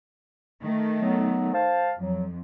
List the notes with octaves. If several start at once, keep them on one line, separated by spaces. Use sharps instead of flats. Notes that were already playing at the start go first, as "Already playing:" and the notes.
D#3 A3
F#3 B3
C5 F5 A5
F2 F#3